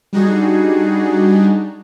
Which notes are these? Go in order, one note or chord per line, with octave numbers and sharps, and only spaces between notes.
G3 D4 D#4 F#4 G#4